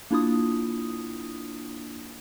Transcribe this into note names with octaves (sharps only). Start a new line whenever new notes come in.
A#3 D4 E4 F4 D#6